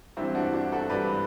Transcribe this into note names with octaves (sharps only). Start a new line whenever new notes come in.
G2 E3 C4 E4
D4 F#4
D4 F#4
F#4 A4
G2 E3 B4 D5